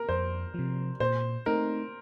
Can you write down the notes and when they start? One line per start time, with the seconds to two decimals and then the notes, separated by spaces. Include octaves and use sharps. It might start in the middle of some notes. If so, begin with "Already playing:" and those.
Already playing: A#4
0.09 F2 C5
0.54 C3 F3
1.00 A#2 C5
1.46 A3 C4 D#4 A#4